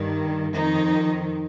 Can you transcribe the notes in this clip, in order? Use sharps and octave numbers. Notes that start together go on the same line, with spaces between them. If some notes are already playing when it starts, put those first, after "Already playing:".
Already playing: G2 D#3
F2 D#3 D#4